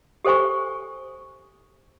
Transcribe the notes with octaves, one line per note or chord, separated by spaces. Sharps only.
G4 A4 C5 G#5 C#6